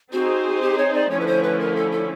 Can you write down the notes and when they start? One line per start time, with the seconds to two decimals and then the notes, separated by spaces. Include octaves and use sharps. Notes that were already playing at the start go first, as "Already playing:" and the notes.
0.13 C4 D#4 F#4 G#4 C5
0.62 G4
0.78 C#5
0.94 D5
1.10 D3 F3 A3 C#4 E4 C#5
1.20 B4
1.27 C5
1.43 B4
1.60 A#4
1.76 A4
1.92 A4